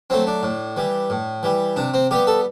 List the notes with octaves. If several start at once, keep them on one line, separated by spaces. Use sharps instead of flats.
F#3 A3 C4
D4
A2
E3 G3
A2
E3 G3
C3 D4
C4
G3 B3 G4
A4